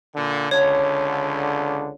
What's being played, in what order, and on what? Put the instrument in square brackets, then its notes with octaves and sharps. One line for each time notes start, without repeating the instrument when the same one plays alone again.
[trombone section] A#2 D3
[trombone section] C#2 D3 [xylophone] C#5